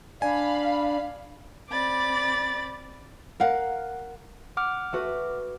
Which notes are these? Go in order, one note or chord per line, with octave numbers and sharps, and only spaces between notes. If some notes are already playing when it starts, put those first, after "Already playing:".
D4 F5 G#5 B5
C4 D5 B5 A6
A#4 F5 F#5
F#5 D6 F6
A3 F#4 B4